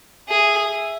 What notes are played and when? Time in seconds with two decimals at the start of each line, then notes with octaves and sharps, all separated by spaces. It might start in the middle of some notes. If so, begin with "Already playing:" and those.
0.28 G#4 E5